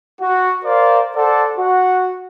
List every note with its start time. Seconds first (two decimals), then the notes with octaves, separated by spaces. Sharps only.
0.21 F#4
0.65 A#4 C5 D5 F5
1.15 A4 C5 D5 F#5
1.56 F#4 F#5